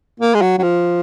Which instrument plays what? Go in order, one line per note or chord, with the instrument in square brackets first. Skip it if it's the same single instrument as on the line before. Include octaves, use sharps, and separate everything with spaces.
[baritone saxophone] A#3
G#3
F#3
F#3
F3